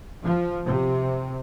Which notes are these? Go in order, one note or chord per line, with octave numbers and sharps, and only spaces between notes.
F3
C3